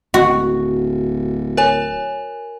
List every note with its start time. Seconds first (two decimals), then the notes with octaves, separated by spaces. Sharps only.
0.14 D1 F#4
1.57 A#4 C#5 G#5